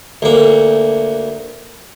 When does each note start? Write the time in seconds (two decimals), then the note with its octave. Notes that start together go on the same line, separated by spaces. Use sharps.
0.22 D2 A#3